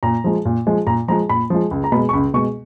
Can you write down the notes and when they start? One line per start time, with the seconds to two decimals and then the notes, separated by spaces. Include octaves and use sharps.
0.03 A#2 A#5
0.24 F3 G#3
0.45 A#2
0.67 F3 G#3
0.87 A#2 A#5
1.08 F3 G#3 A#5
1.29 A#2 B5
1.50 F3 G#3
1.71 C#2
1.84 A#5
1.92 B2 B5
1.95 G#3
2.09 C#6
2.13 C#2 B5
2.34 B2 G#3 C#6